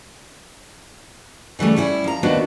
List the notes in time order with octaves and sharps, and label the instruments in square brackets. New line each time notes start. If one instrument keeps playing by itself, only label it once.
[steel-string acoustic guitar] C#3 E3 G3 A3
G3 C#4 E4
F3 A#5
D#2 B3 D4 F#4 C5